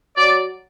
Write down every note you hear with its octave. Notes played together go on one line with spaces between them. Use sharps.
F#3 D5